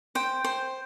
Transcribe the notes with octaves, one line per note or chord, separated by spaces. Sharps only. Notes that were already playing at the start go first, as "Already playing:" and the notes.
C5 G5
C5